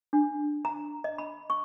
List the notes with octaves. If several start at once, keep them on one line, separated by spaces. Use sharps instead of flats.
D4
A#5
D#5
B5
C#6